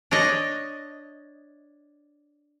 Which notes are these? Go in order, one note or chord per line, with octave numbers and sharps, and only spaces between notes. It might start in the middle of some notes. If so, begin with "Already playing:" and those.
D4 C#5 D#5